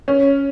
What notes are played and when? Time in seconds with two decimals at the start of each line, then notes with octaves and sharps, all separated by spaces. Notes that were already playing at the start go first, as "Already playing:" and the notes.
0.08 C#4